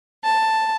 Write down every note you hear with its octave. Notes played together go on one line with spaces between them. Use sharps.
A5